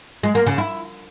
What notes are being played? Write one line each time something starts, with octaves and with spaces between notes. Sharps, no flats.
G#3
A#3
C#3
E4